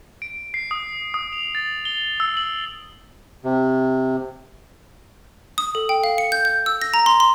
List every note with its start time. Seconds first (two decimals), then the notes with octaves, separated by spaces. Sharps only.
0.22 D7
0.54 C7
0.71 D#6
1.14 D#6
1.33 F7
1.55 A6
1.85 G7
2.20 E6
2.37 F#7
3.44 C3
5.58 D#6
5.75 A4
5.89 G5
6.04 F5
6.18 C#7
6.32 G6
6.45 G6
6.66 E6
6.82 A#6
6.94 A#5
7.06 C6
7.20 C6